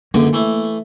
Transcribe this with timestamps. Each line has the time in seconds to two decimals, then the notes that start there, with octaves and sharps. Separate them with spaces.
0.14 C#2 F#2 D3 A#3
0.33 E3 A3 E4